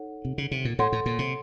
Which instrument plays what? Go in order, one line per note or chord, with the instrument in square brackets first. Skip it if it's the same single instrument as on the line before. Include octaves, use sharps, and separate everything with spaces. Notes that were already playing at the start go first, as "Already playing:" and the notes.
Already playing: [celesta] D#4 A4 C#5 F#5
[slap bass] C3
C#3
C3
A#2
[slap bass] A2 [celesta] A4 C#5 F#5 C6
[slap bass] A2
A#2
C3